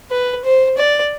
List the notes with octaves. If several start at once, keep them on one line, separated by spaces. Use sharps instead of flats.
B4
C5
D5